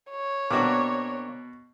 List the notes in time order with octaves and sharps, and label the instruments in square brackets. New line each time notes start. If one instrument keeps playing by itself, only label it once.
[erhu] C#5
[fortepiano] B2 F#4 [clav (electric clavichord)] A#3 C4 D4 [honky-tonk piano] D6